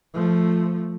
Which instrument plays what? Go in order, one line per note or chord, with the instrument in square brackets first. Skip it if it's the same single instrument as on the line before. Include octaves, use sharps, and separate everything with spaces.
[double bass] F3 A3